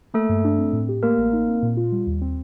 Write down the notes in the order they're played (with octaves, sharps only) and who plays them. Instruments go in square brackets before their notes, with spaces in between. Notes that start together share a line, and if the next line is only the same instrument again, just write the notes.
[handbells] A3 A4 [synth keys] A#3
[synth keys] G2
D4
C4
A2
G4
[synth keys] A3 [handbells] A#3 A#4
[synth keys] A1
D#4
C4
A#2
F4
G3
D#2
C4